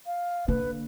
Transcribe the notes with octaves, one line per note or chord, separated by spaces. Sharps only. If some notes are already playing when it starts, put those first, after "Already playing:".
F5
D3 A#3 B4